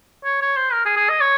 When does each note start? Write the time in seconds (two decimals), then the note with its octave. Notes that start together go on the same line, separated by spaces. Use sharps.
0.25 C#5
0.42 C#5
0.56 C5
0.72 A#4
0.85 G#4
0.97 G#4
1.09 D#5
1.21 C#5